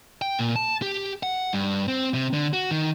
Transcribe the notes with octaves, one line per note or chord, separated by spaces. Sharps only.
G5
A#2
A5
G4
F#5
G2
C4
C3
D3
F#4
D#3